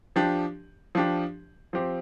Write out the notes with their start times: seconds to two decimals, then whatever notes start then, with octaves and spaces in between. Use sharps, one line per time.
0.16 F3 D4 G4
0.95 F3 D4 G4
1.73 F3 C4 G4